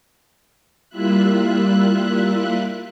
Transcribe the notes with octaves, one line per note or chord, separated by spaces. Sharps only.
G3 A#3 E4 F4 E5 F#6